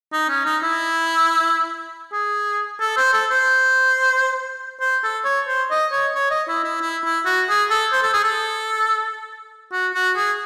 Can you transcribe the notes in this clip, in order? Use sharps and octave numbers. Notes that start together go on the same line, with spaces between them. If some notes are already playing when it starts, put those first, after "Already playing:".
D#4
C#4
D#4
E4
G#4
A4
C5
A4
C5
C5
A4
C#5
C5
D#5
C#5
C#5
D#5
E4
E4
E4
E4
F#4
G#4
A4
C5
A4
G#4
A4
F#4
F#4
G#4